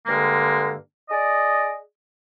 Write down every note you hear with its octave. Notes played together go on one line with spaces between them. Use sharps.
G2 D3 G#3 A#3
G#4 D5 D#5